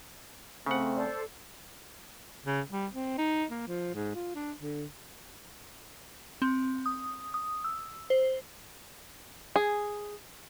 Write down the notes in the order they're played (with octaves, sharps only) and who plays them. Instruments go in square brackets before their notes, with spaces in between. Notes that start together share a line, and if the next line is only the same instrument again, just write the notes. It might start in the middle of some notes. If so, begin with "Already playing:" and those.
[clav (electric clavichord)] C#3 F#5 [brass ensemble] A3 C4
[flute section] A4 C5 D5
[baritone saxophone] C#3
G3
C4
D#4
A#3
F3
G#2
F4
D4
D3
[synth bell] C4
D#6
D#6
E6
C5
[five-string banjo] G#4